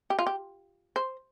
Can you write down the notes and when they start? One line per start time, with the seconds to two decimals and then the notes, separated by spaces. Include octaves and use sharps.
0.10 G4
0.19 F4
0.27 G4
0.96 C5